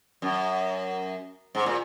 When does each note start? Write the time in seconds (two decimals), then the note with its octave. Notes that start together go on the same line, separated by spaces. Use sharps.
0.22 F#2
1.55 G#2
1.66 A#2